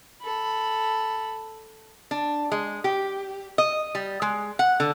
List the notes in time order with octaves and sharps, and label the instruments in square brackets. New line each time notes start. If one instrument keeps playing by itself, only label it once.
[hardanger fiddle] A4 B5
[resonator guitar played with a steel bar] D4
G#3
G4
D#5
G3
G#3
F#5
D3